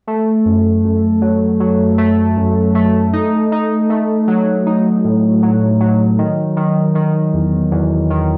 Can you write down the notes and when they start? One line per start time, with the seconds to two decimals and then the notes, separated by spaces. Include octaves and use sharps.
0.07 A3
0.46 F#2
0.84 F#2
1.22 F#3
1.60 F#3
1.98 A3
2.37 F#2
2.75 A3
3.13 D#4
3.52 D#4
3.90 A3
4.28 F#3
4.67 D#4
5.04 A2
5.43 F#3
5.80 F#3
6.18 D#3
6.57 D#3
6.95 D#3
7.34 E2
7.71 E2
8.10 D#3